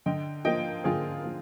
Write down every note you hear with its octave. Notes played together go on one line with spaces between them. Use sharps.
D3 D#5 G5
F3 A#3 D#5 G5
D3 F4 G#4
F3 A#3